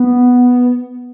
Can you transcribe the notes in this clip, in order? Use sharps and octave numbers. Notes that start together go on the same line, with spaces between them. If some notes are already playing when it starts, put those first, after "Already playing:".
Already playing: B3